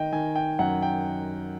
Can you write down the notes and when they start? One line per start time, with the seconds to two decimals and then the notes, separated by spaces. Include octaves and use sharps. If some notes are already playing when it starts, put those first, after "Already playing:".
Already playing: D#3 D#5 G5
0.12 D#3 G#5
0.36 G5
0.59 F#2 F#5
0.82 G5